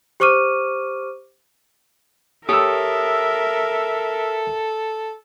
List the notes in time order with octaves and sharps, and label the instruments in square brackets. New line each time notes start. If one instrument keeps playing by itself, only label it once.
[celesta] G4 C5 C#6 D6 F6 D#7
[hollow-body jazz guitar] G4 C#5 [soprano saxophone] A4 [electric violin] A#4 E5 [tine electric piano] D#6 E6